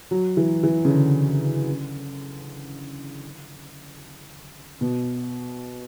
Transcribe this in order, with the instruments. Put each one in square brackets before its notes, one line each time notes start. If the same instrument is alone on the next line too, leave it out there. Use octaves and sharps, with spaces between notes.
[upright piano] F#3
E3
E3
C#3
D3
B2